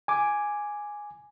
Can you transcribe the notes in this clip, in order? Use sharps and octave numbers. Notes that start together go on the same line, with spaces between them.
G#5 D6